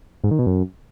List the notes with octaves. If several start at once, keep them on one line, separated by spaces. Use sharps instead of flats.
G#2
D#3
B2
F#2